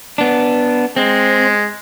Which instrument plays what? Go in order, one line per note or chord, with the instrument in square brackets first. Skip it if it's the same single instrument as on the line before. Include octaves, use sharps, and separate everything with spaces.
[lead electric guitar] B3 D4
[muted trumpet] G#3 [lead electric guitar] C4